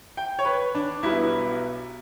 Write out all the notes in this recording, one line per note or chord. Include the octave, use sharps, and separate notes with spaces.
G5
C#5
B4
D4
B1 B2 G3 B3 E4